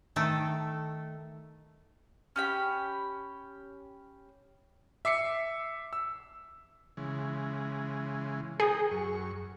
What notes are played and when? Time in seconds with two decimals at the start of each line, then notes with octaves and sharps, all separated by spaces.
0.16 D#3 A3 A4
2.36 C#4 G4 B5
5.05 E5 D6 C7 C#7
5.93 E6
6.97 C#3 E3 G#3
8.60 G#4 A#4 G5
8.91 F#2 C#6